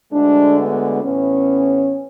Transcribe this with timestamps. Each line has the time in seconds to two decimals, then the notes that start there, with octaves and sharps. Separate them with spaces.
0.13 D2 D3 G#3 D4
0.57 B3
1.02 A2 E3 B3 C#4